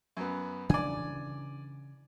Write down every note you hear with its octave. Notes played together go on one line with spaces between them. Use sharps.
F#2 B3
C#3 E3 D4 D5 G#5